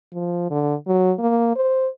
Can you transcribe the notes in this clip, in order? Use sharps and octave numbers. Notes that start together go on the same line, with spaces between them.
F3
D3
F#3
A#3
C5